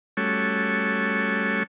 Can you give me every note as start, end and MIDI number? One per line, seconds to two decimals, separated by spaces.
0.17 1.63 55
0.17 1.63 57
0.17 1.63 61
0.17 1.63 66
0.17 1.63 69
0.17 1.63 73